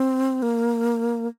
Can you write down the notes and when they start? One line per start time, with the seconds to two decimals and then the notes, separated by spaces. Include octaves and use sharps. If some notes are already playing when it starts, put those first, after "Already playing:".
Already playing: C4
0.42 A#3